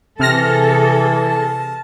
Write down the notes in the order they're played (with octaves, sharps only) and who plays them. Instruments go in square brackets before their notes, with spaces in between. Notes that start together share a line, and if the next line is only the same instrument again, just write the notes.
[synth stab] C3 F6 A#6 [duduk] E3 [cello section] G#4 A4 [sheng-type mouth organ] A5